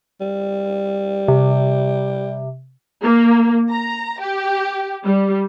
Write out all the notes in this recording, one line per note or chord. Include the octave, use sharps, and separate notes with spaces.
G3
C3
A#3
A#5
G4
G3